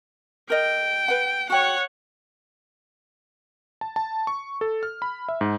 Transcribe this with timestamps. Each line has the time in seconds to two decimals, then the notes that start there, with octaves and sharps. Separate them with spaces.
0.50 A#4 D#5 G5
1.08 B4 F#5
1.50 F#4 C#5 F#5 G5
3.81 A5
3.96 A5
4.27 C#6
4.61 A4
4.83 F6
5.02 B5
5.29 E5
5.41 G#2